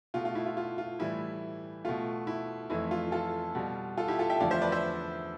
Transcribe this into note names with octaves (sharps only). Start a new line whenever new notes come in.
B2 A3 F4
F4
E4
F4
F4
F4
A2 E3 G3 E4
B2 A3 F4
E4
F2 E3 A3 E4
F4
F4 A4
B2 G3
F4 A4
E4 G4
F4 A4
E5 G5
E2 D3 F3 A3 D5 F5
C5 E5
B4 D5
C5 E5